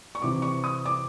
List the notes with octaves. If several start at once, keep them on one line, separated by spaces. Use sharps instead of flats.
C#6
C3 E3 D6
C#6
D#6
D6